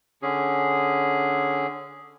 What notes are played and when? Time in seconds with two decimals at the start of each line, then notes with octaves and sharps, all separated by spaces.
0.22 D3 C#4 G#4